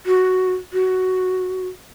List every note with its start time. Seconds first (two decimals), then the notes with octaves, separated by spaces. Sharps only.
0.06 F#4
0.73 F#4